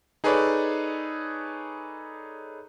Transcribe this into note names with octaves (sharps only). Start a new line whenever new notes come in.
D#4 G#4 A4 B4 C#5 D5